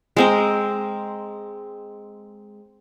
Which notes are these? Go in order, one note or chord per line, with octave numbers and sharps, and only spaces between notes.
G#3 C4 A#4